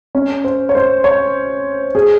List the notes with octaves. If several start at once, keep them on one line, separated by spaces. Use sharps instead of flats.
C#4
C5
C#5
C5
C#5
G#4